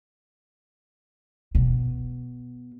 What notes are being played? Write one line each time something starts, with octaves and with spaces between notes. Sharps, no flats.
B2